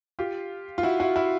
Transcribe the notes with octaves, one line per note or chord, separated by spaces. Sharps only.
F4 G4
F4
E4 F#4
E4 F#4
E4 F#4